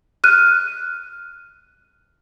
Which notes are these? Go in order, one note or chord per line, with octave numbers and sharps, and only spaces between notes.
F6 F#6 D#7